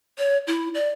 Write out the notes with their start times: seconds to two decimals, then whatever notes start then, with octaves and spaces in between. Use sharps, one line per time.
0.18 C#5
0.47 E4
0.74 D5